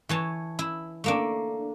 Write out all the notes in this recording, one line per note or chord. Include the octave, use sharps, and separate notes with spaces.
E3 C#5 A5
E4
A3 A#3 D4